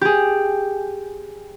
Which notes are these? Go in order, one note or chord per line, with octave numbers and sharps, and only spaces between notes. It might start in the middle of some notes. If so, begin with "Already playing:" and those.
G4 G#4